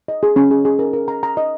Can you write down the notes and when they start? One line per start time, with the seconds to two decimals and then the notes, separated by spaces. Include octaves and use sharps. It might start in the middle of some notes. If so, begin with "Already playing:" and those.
0.08 D#5
0.23 G#4
0.36 C#4
0.51 G#4
0.65 G#4
0.79 A#4
0.93 A#4
1.08 A#5
1.23 A#5
1.37 D#5